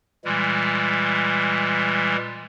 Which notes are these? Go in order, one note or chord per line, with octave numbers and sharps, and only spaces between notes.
A#2 E3 G3 G#3